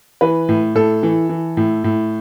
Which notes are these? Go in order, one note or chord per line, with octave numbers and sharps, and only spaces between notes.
E3 B4
A2
A2 A4
E3
E3
A2
A2